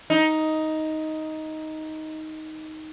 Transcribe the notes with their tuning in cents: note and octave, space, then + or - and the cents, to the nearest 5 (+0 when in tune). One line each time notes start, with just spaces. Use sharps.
D#4 +10